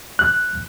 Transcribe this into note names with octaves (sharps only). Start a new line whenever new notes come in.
F#6